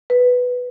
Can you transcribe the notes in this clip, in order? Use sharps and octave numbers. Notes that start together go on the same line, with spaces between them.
B4